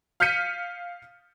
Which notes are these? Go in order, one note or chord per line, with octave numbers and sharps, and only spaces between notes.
F5 F6 G6 B6 C#7 D#7